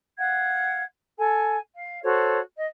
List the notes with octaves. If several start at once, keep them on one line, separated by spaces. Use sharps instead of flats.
F5 F#5 G#6
A4 G#5
F5
F#4 A4 C5 C#5
D#5